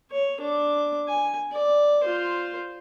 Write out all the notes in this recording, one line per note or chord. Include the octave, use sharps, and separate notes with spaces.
C#5
D4 D6
G#5
D5
F4 C5